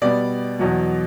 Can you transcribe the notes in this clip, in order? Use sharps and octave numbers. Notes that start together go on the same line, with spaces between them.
B2 G3 B3 D5
E2 B2 F#3